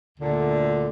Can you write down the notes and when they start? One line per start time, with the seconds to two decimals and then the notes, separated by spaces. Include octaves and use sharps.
0.19 D2 A#2 D3